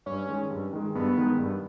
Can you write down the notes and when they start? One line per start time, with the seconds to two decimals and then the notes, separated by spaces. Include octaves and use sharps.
0.06 G2 C#4
0.29 D#3 G#3
0.51 G2
0.73 D#3 G#3
0.95 G2 B3
1.17 D#3 G#3
1.39 G2